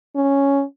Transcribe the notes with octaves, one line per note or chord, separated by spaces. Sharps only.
C#4